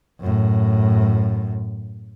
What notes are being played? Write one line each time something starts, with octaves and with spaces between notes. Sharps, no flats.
F#2 A2